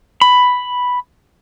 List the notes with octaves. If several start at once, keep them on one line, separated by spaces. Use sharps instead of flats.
B5